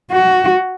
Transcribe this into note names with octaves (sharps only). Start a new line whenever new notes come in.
F#4